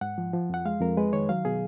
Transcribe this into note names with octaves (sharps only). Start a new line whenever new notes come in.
G#2 F#5
F3
F3
F2 F#5
G#3 F5
F2 A#4
G#3 B4
D#3 C#5
F#3 F5
B2 G#4